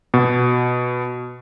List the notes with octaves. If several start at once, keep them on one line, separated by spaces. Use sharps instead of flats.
B2